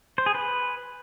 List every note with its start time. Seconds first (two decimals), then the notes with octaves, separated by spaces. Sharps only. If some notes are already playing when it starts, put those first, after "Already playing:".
0.18 C5
0.26 G#4
0.35 B4